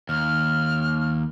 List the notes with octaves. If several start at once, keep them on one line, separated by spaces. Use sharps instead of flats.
D#2 F6